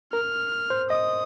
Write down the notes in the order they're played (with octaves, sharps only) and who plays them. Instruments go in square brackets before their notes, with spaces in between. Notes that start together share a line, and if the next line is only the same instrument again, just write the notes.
[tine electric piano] A#4 [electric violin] F6
[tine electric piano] C5
[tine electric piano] D#5 [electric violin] D#6